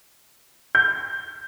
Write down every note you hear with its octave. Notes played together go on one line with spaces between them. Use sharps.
G6